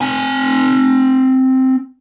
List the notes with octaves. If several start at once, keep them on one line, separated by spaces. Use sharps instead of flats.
C4 G#5